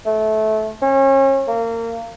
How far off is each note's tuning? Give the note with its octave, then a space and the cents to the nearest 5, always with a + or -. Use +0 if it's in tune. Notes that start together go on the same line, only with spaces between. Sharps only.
A3 -20
C#4 -35
A#3 -25